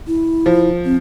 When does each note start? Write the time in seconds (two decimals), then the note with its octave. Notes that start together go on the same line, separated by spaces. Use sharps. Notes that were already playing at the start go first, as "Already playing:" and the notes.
0.07 E4
0.46 F3
0.85 C4